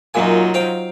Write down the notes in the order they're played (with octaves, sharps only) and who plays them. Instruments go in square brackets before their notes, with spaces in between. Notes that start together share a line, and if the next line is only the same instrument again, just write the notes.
[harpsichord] F#2 A#2 G#5 [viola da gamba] F#3 D#4 F4
[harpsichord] C5 F5 G5